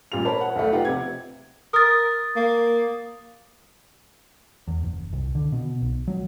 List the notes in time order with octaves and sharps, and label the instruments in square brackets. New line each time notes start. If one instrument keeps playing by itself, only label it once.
[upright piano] A1 A#2 G3 F4 F7
A#4 C5 C#5 A5 B5
F#5
B1 E2 A3
D#4 F4 G4 B4 F#5
F1 C3 G#6
[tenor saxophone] A#4 [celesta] D#6 A6
[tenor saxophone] A#3
[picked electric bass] E2
F#1
C2
D3
B2
B1
F#3